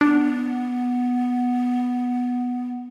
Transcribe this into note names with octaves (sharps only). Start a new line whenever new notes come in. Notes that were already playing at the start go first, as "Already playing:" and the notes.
B3 D4